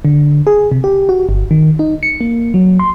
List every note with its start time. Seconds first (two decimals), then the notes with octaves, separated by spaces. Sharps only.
0.05 D3
0.47 G#4
0.72 C3
0.84 G4
1.09 F#4
1.29 G1
1.51 D#3
1.79 D#4
2.03 C#7
2.21 A#3
2.54 F#3
2.79 C6